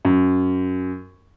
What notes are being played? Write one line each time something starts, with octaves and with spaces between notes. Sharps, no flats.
F#2